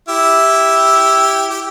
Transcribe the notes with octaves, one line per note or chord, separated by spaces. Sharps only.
E4 G4
G4